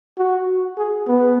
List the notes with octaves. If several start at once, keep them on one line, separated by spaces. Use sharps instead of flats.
F#4
G#4
B3